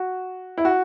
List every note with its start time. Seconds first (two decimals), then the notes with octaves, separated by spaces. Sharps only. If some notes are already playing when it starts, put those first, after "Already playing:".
Already playing: F#4
0.58 E4
0.65 F#4